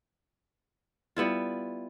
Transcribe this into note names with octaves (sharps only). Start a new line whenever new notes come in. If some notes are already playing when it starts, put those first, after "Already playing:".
G3 B3 E4 F4